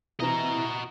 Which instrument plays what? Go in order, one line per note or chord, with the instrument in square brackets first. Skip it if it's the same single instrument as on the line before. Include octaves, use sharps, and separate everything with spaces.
[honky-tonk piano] C3 E3 E4 [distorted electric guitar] F#4 D#5 [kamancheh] A#5